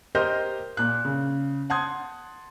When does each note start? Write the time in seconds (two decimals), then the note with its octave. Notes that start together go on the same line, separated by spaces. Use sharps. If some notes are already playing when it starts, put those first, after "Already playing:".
0.15 G4 A#4 C5 D#5 F6 G6
0.77 A#2 F#6
1.05 C#3
1.70 F#5 A5 C6 D#6 G#6